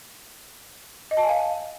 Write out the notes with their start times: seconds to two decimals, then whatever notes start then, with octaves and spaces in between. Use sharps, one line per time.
1.11 D#5
1.17 A5
1.23 G#5
1.29 F5